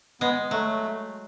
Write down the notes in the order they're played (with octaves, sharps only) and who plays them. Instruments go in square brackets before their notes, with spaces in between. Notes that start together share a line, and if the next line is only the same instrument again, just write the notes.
[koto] G#3 [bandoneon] B3
[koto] F#3 [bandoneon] A3